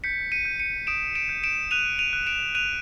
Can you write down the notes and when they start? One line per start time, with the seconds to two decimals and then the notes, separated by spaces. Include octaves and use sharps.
0.04 G6 B6 C#7
0.32 C#7 D#7
0.45 G6
0.60 C#7 D#7
0.87 D#6 D7 E7
1.15 D7 E7
1.29 G6
1.44 D7 E7
1.71 F#6 D#7 F7
1.99 D#7 F7
2.13 F#6
2.27 D7 E7
2.55 F#6 D#7 F7